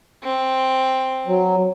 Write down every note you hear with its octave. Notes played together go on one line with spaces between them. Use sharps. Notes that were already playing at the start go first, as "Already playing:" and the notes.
C4
F#3